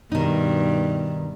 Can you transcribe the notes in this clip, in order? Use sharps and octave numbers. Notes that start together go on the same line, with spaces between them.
G2 B2 D#3 D#4